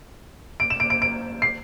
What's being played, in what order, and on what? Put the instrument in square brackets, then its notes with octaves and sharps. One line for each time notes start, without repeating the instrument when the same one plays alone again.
[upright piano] D7
E7
D7
D7
D7
C7